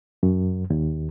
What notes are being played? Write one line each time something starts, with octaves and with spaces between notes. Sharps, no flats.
F#2
D#2